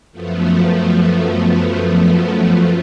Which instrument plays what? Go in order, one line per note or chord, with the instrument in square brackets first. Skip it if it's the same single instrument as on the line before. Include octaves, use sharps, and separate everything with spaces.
[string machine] F#2 F3 A3 B3